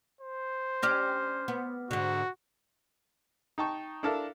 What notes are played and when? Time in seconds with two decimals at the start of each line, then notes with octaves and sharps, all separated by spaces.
0.21 C5
0.83 C#4 D4 G4 D6 F6 A#6
1.48 B3
1.91 G#2 D3 F#4
3.58 D#4 G5 A5 C#6
4.03 D4 E4 A4 A#4 F5 A5